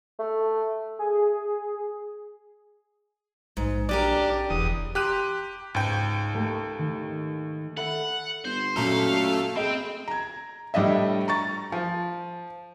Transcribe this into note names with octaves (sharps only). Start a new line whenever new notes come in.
A3
G#4
A#1 G#2
C#4 D4 G4 A#4 D5
E1 E2 D#6
G4 A#5 C6 F#6 A#6 D#7
C#2 G#2 G5
A3 A#3 G4
D#3
A4 E5 F#5 B5
G1 C5
F#2 A#2 A3 A4 F5 A#5 B6
C4 G#4 D#5 G5 B5
A#5 G#6
A2 G3 D4 D#5 E5
A#5 C#6 A6
F3